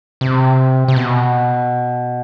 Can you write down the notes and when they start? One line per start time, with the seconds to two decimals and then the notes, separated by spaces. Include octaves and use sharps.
0.21 C3
0.88 C3
0.96 B2